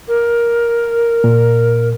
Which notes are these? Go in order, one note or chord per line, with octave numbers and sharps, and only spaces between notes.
A#4
A#2